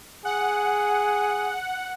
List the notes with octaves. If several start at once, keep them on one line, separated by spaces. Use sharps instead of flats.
G#4 F#5